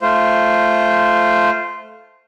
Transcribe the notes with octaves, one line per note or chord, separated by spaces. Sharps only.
A3 F4 C5